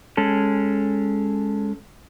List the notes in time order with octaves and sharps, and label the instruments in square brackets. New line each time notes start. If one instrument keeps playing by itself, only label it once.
[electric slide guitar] G#3 C#4 A4